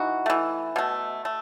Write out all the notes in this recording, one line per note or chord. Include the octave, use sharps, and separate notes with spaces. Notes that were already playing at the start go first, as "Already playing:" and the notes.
Already playing: E3 D#4 F#4
E3 A3
B2 A3
A3